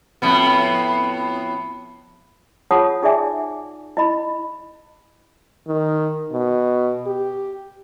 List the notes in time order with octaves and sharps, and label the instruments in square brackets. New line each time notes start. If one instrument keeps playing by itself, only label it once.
[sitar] F2 A2 B3
[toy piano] F4 G#4 C#5 F#5 A5 D#6
D#4 G#4 D5 E5 G#5 D6
E4 D#5 B5
[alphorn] D#3
B2
G4